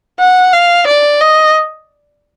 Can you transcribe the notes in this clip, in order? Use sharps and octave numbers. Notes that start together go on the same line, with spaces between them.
F#5
F5
D5
D#5